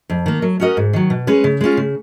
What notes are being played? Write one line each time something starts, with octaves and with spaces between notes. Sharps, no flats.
F2
D#3 A#3
F#3
C#4 F#4 A#4 D#5
G#2
D#3 F#3
B2
G#3 C#4 G#4 B4
C#3
G#3 C#4 F4
C#3